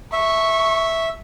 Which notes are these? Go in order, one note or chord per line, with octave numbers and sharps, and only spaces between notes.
E5 C#6